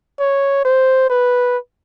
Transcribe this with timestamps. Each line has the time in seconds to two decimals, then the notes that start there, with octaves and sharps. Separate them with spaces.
0.19 C#5
0.65 C5
1.10 B4